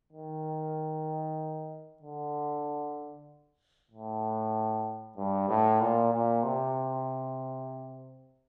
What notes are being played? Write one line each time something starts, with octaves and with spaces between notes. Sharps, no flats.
D#3
D3
A2
G2
A2
A#2
A#2
C3